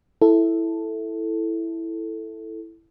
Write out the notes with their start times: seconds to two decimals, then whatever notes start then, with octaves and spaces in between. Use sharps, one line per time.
0.22 E4 A4